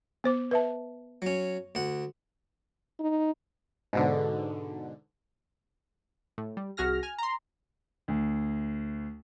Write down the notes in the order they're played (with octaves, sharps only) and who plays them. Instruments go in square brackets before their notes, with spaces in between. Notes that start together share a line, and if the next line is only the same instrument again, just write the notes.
[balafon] B3 C5 D6
B4 E5 A5
[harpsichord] F#3 C#4
D2 F#5
[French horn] D#4
[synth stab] G#2 B2 D3
[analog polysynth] A2
G3
C2 F#4 G#4 F6 A#6
G#5 F6
A#5 C6
[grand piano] D2